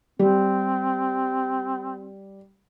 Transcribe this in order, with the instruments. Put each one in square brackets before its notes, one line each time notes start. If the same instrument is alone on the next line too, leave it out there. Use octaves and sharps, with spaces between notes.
[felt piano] G3 [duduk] C4